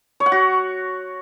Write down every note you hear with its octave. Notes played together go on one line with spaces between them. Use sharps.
C#5
F#5
F#4